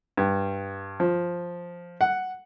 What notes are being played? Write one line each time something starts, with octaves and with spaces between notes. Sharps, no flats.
G2
F3
F#5